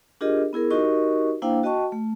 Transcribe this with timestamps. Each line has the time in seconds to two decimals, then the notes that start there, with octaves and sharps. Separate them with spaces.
0.21 D4 F4 G4 G#4 A#4 D#5
0.53 B3 E4 G#4 A#4
0.71 D#4 F#4 G4 A#4 D#5 C#6
1.42 A#3 D4 E4 C5 F5 G5
1.63 F#4 D#5 G5 A5 C#6
1.92 A3